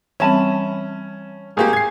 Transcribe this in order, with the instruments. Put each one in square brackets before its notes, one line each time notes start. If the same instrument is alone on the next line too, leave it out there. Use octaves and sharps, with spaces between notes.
[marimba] E3 G3 C4 [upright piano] C#4 [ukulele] E5 A5 B5
[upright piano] G#1 A#3 G4 [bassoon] G#4
[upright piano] G#6 C7